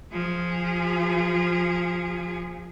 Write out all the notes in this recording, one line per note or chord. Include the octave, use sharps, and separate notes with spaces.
F3 G#4